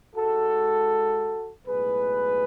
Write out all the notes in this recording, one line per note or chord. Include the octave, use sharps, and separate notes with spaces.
G#2 G#3 F#4 A4
B1 A2 G#3 G#4 B4